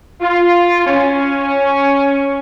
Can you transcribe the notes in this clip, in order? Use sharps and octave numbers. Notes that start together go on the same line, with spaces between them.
F4
C#4